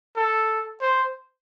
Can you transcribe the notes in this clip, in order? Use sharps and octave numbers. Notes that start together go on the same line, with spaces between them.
A4
C5